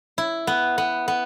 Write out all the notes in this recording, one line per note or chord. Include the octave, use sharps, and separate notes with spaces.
E4
B3
B3
B3